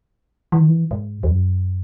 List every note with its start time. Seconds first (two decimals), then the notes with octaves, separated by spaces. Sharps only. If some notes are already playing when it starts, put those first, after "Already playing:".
0.52 E3
0.60 D#3
0.69 E3
0.91 G#2
1.23 E2
1.29 F#2